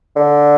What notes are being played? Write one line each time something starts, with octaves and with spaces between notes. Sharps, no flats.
D3